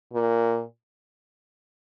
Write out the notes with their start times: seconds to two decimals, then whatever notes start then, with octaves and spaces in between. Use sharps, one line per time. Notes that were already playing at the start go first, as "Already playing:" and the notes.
0.13 A#2